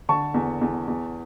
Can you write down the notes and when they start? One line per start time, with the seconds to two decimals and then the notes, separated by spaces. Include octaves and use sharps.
0.09 D3 A5 C#6
0.34 E2
0.61 E2
0.88 E2